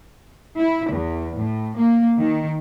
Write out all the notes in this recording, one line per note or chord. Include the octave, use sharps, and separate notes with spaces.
E4
E2
A2
A#3
D#3